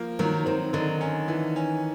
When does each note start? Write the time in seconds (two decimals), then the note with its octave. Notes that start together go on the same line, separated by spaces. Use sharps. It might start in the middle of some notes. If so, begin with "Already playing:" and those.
Already playing: F3 A#3
0.19 D#3 F#3
0.46 D#3 C4
0.73 D3 D#3
1.01 C#4
1.28 E3
1.56 C#4